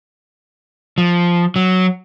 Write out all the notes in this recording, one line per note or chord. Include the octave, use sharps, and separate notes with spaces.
F3
F#3